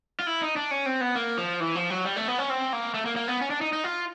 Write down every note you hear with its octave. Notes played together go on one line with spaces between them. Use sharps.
F4
E4
D#4
D4
C#4
C4
B3
A#3
F3
E3
F3
F#3
G3
A3
B3
C#4
C4
A#3
A3
A#3
A#3
B3
C#4
D4
D#4
D#4
F4